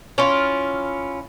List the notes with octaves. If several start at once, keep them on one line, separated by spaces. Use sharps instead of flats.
C#4 E4 F4